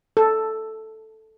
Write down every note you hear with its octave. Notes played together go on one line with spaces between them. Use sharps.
A4